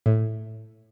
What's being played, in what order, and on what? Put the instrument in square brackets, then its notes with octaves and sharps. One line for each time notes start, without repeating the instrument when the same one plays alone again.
[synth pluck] A2